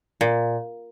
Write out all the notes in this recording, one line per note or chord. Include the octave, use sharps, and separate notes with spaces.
A#2